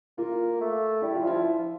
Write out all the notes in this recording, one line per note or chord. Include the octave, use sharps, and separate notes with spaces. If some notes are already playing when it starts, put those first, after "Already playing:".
A#3 F4
A3
G3 E4
F4
F3 E4
F3